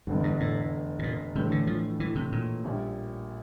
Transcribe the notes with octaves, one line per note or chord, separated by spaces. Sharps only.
F1 E2 G2 D3
G2
A2
C3
A#2
A2 C3 E3 A3 D4
D3
F3
E3
C3
A#2
A#1 A#2 G3